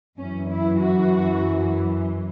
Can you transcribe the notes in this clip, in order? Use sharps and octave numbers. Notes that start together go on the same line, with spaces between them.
F#2 E3 C#4
E4
F#4